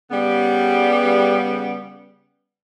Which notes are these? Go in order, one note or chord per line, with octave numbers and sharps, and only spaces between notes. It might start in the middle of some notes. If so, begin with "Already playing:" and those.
C#3 G3 B3